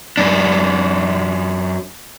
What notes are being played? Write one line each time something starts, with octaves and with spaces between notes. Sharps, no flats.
F#2 D4